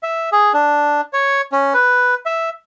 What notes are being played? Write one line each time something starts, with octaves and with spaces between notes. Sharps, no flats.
E5
G#4
D4
C#5
C#4
B4
E5